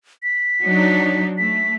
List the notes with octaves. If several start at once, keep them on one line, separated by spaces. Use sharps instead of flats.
B6
F#3 D4 D#4
A3 B6